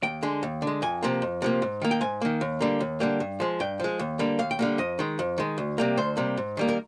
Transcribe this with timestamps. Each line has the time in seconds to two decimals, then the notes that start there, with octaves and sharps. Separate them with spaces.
0.03 D#2 G5
0.23 D3 G#3
0.43 D#2
0.62 D3
0.67 G#3
0.82 F2 G#5
1.03 C3 F3 A#3
1.22 F2
1.42 C3 F3 A#3
1.62 G#2
1.82 D#3 A#3
1.91 G5
2.01 G#2 G#5
2.21 D#3 A#3
2.41 D#2
2.61 D3 G3 A#3
2.80 D#2
3.00 D3 G3 A#3
3.20 G2
3.40 F3 G#3
3.60 G2 G5
3.80 F3 G#3
3.99 D#2
4.19 D3 G3 A#3
4.39 D#2 F5
4.51 G5
4.59 D3 G3 A#3 F5
4.78 F2 D#5
4.99 D#3 G#3
5.19 F2
5.38 D#3 G#3
5.58 D2
5.78 C3 G3 A#3
5.97 D2 C5
6.17 C3 G3 A#3
6.37 G#2
6.57 D#3 G3 A#3
6.69 A#4